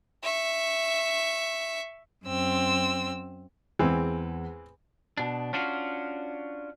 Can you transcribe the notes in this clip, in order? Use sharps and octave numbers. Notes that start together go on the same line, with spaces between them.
E5 C#6
F#2 C4 E6
E2 E3 G#3 C4
B2 D4
C#4 D4 F4 F#4